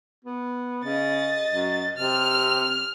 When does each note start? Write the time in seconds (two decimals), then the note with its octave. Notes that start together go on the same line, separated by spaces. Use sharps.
0.25 B3
0.84 C#3 D#5 A6
1.53 F#2
1.97 C3 F6